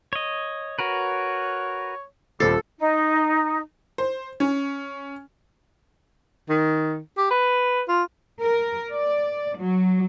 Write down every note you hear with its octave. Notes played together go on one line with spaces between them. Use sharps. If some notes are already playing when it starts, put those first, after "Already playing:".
C#5 D#5
F#4 A#4 B4 C#5
D#1 G3 A4 C5 C7
D#4
C5
C#4
D#3
G4
B4
F4
A#4
D5
F#3